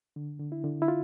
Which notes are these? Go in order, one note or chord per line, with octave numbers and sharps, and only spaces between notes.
D3
D3
E4
D3
E4
F4